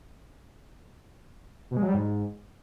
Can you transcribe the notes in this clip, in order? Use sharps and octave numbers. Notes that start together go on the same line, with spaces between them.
B2
G#3
F#3
G3
G#2